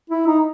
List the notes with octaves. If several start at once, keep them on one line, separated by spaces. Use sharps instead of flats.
E4
D#4